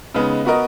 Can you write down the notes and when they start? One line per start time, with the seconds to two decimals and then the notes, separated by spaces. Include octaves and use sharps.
0.15 C#3 G#3 B3 D#4
0.45 B3 F#4 A#4 D#5